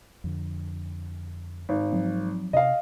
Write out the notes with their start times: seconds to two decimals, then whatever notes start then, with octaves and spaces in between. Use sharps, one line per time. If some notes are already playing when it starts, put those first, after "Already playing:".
0.24 F2 D3
1.69 G#1
1.92 F3 F#3 C4
2.53 C3 D#5 F5